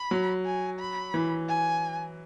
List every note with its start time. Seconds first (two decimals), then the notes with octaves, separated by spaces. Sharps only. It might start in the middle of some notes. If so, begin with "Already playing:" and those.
Already playing: B5
0.11 F#3
0.45 G#5
0.80 B5
1.14 E3
1.48 G#5